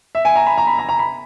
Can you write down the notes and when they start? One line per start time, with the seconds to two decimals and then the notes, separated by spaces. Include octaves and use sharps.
0.15 E5
0.25 G#5
0.36 A#5
0.46 B5
0.57 A#5
0.67 B5
0.79 A#5
0.89 A#5
0.99 B5